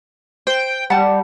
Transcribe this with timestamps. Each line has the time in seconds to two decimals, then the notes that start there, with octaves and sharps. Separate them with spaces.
0.47 C5 G5
0.90 G3 F#5 A5